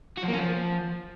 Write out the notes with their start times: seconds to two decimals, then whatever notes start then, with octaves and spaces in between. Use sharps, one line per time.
0.17 F#4
0.23 F3
0.28 A#3
0.33 C#4
0.38 F3